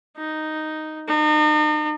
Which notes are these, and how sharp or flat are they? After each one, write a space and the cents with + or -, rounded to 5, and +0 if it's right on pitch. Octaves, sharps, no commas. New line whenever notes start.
D#4 +0
D#4 -40